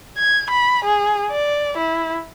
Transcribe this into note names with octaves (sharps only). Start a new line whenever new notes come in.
G#6
B5
G#4
D5
E4